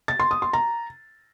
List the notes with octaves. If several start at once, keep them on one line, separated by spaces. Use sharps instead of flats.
A6
C6
D#6
C6
A#5